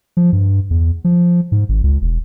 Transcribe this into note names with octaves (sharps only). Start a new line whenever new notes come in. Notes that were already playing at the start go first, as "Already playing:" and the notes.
F3
G2
E2
F3
G#2
G#1
C#2
E1